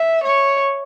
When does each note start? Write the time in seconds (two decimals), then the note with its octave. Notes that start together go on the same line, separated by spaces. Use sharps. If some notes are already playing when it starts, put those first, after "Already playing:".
Already playing: E5
0.23 C#5